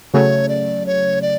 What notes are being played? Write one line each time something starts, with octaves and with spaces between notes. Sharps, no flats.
C#3 F#3 A3 C#5
D5
C#5
D5